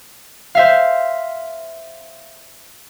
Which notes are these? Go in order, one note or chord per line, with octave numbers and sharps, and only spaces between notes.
C5 E5 F5